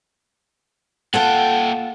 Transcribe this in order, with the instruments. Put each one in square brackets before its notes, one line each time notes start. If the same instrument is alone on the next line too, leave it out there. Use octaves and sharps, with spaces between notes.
[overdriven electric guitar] A#2 G5 [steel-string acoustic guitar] F4 A4 F#5